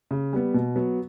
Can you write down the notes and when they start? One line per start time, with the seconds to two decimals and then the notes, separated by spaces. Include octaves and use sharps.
0.11 C#3
0.33 G3 B3
0.54 B2
0.76 F#3 B3